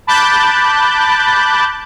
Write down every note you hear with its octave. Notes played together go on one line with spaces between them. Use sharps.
A5 B5 D6 F#6 G6 A6